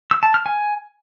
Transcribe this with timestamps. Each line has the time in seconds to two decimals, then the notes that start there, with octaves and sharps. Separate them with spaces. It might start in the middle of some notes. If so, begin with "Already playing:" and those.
0.11 E6
0.23 A5
0.34 F6
0.46 G#5